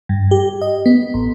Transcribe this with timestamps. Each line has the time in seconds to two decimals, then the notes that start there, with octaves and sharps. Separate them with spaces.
0.09 G2
0.31 G4
0.62 D#5
0.86 B3
1.14 A1